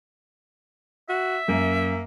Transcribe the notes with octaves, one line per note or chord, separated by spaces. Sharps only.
F#4 E5
F#2 A#3